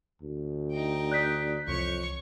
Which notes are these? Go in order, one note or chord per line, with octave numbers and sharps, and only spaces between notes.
D2
D#4 G5
D5 D#6 F#6 G6 B6
C2 F2 E3 C#5 C#6 C#7